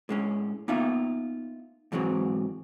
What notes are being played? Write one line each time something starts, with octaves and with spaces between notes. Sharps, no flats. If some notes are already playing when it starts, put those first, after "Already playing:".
A2 G#3 C#4
A#3 B3 D#4 F4 E5 F5
G#2 E3 F#3 G#3 C4